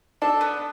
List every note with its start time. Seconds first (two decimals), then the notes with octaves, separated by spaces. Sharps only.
0.22 D4 A4
0.41 B3